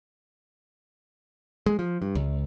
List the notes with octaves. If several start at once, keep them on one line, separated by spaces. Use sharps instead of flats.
G#3
F3
G2
C#2